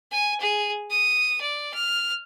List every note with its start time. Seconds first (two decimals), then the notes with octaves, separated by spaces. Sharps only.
0.11 G#5
0.40 G#4
0.90 D#6
1.41 D5
1.74 F6